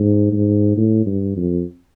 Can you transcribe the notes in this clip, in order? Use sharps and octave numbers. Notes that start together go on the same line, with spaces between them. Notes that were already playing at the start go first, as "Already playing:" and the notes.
Already playing: G#2
G#2
A2
G2
F2